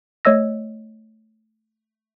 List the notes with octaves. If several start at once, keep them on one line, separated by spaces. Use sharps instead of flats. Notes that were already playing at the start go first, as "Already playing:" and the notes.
A3 C#5 D#5 E6 A#6